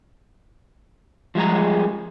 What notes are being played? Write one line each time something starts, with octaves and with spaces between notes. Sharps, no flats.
F3 G3 G#3 G#4 A#5